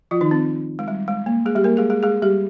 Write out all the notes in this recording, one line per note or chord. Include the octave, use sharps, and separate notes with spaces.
F3 F4
D#3 D#4
C4
G#3
G3
G#3
A#3
G#3 G#4
G3 G4
A#3 A#4
G#3 G#4
G#3 G#4
G#3 G#4
G3 G4